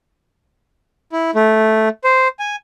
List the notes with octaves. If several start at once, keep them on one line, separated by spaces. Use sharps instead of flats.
E4
A3
C5
G#5